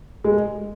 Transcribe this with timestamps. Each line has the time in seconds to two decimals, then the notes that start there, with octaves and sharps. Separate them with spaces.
0.24 G#3